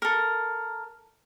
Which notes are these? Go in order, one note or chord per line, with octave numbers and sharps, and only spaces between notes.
A4 A#4